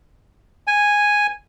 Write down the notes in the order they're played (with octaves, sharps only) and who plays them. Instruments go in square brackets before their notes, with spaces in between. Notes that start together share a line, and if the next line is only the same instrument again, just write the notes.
[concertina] G#5